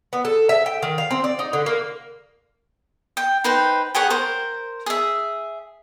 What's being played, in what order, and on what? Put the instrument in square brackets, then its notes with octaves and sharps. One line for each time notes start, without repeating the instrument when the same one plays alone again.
[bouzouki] B3
A4
E5
G5
D#3
F5
C4
D5
D#4
D3
A#3
[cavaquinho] G5
D#4 B4 C5 G5
G4 G#4 C#5 F#5
A#4 C5
G#4 E5